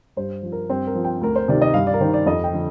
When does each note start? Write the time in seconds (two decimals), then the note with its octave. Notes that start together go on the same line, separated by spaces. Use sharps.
0.17 G2 C5
0.43 F3
0.52 A#4
0.69 G2 C4
0.87 A#4
0.95 F3
1.04 G5
1.21 D2 A#4
1.36 C5
1.48 C3 D#3 D5
1.62 D#5
1.74 G2 F5
1.87 D5
1.94 A#4
2.00 D#3 C5
2.14 D5
2.26 F2 D#5
2.44 G5
2.53 D3 F3